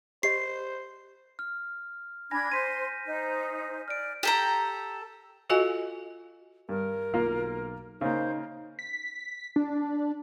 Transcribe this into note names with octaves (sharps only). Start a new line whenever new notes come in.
G4 C5 D#5 C7
F6
D4 G#5 B5 G#6 A#6
C5 C6 G6 B6 D#7
D#4 C5
D5 F6 D7
G4 A4 A#5
F4 F#4 A4 D#5 F5 G#5
G2 A#4
B1 A#3 F4 F5
C#3 A#3 D#4 C5
B6
D4